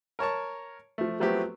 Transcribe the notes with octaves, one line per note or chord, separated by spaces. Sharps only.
A#4 C#5 A5 C#6
F3 A3
F3 F#3 A3 B3 C4 G4